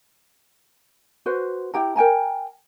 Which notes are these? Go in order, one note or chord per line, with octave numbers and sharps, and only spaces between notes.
F#4 B4 C5
E4 G4 G5 A#5
A#4 G5 G#5 A#5